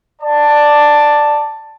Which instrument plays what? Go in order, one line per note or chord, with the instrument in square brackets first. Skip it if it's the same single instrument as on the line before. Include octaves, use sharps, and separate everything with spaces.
[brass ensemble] D5 A5